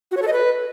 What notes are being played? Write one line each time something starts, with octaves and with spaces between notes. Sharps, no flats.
F#4
C#5
A4
D#5
B4